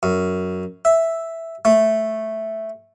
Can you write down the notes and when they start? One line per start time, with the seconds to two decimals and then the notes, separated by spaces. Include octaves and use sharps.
0.03 F#2
0.85 E5
1.65 A3